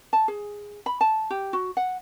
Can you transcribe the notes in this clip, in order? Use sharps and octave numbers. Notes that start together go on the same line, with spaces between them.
A5
G#4
B5
A5
G4
F#4
F#5